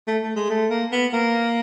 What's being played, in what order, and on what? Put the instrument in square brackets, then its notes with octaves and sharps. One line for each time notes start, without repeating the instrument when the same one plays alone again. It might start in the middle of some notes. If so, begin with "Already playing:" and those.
[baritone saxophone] A3
A3
G#3
A3
A#3
B3
A#3